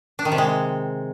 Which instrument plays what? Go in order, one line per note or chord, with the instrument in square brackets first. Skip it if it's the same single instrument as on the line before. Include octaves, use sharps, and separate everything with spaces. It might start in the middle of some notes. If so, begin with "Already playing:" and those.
[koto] D4
D#3
C3
G#3